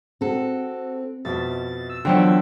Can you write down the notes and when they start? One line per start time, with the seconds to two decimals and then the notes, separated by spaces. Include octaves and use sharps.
0.21 C4 F#4 A4
1.25 F2 B2 E5 A6
1.90 E6
2.05 E2 D3 F3 F#3 F#5 G5